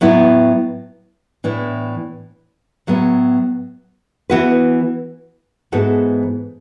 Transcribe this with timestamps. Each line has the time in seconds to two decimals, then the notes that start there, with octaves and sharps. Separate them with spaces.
0.01 A2 F#3 B3 E4
1.44 A2 E3 B3 D4
2.87 A2 F#3 B3
4.30 E3 B3 F#4 B4
5.72 G#2 E3 B3 F#4 A4